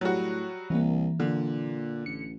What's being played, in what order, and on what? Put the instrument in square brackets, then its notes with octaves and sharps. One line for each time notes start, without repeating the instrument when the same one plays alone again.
[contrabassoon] A2 [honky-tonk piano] F#3 G3 F#4
[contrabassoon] C2 [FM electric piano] E3 A#3
[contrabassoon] A#2 [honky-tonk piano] D3
[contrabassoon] A1 [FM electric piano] C#7